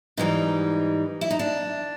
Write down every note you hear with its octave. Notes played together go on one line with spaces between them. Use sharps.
G#2 E3 G3 D#4
E4
D#4
D4